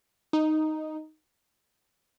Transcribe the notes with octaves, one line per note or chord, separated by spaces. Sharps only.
D#4